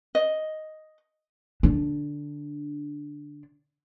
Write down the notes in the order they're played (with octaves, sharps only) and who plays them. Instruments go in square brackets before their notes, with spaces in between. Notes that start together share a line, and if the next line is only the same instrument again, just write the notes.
[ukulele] D#5
[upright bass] D3 D4